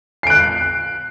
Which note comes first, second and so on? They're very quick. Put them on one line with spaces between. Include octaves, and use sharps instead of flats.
C7 D7 F#6